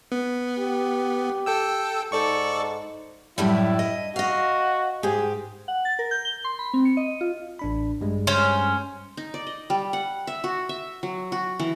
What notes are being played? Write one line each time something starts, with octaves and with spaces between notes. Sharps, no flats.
B3
G4
A4 G5 E6
G#2 A4 D5 C#6
F#2 A2 G3 E4
D#5
F#4 D#5 F5
G#2 G4 G#4
F#5
A6
A#4
G6
G7
C6
B5
C4
C#7
D#5
F4
A1 D4 B5
G2 G3 G#3
C#4 C5
D#4
D5
D#5
G3
F#5
E5
F#4
E5
F#3
F#4
E3